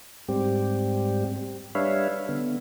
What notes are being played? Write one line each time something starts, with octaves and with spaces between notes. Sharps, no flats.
G#2 G3 C4 G4
G3 D4 B4 C#5 E5 F5
D3 B3